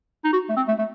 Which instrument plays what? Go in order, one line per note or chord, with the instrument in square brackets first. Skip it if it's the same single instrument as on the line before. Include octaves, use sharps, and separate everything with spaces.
[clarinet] D#4
F#4
A3
C4
A3
A3